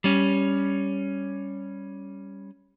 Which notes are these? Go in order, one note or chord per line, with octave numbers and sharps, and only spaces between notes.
G3 C#4